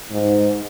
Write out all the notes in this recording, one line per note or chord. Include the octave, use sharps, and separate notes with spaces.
G#2